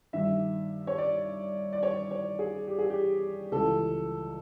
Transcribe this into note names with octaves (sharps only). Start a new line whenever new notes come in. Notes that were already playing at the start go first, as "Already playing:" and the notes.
G2 D#3 E5
C#5
D5
D5
C#5
C#5
G#4
G4
G#4
G4
C#2 C#3 E3 A4